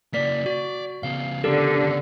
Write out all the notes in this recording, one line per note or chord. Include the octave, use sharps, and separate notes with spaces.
C#3 A#3 D5 B6
F#4 D5
C#3 B3 F5
D3 G4 A4 A#4